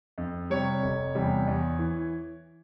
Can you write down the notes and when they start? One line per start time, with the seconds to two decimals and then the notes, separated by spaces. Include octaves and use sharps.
0.18 F2
0.50 C3 G3 C#5
0.82 F1
1.15 E2 C3 G3
1.47 E2
1.79 E3